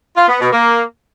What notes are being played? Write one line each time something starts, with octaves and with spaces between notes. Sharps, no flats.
F4
B3
B2
A#3